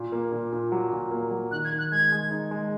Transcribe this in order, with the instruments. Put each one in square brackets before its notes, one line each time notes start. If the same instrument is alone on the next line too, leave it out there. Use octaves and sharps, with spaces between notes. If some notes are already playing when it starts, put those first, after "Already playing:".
Already playing: [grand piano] A#2
A#3
A#2
A#2
F#3
A#2
A#3
F#3
[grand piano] D#3 [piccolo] F#6
[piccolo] G#6
[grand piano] D#3
[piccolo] F#6
[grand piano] G#3 [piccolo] G#6
[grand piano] G#3
D#4
G#3